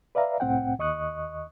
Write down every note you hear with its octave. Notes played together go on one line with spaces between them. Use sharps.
B4 D5 E5 F5 A#5
C2 A2 C4 F#5 G5
D#2 D#5 C#6 D#6 F#6